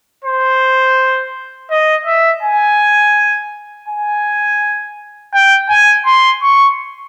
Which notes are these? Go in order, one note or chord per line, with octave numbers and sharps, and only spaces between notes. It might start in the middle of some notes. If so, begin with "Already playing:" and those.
C5
D#5
E5
G#5
G#5
G5
G#5
C6
C#6